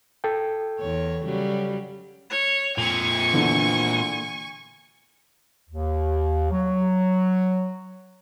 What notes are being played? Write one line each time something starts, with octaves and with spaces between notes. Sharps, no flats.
A4 G5
E2 C#5
C#3 F#3 G3
C#5
A#2 C4 G#5 C#6 F7
D3 E3 B3
D#2
F#3